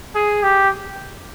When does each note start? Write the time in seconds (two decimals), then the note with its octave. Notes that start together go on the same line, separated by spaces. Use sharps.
0.15 G#4
0.43 G4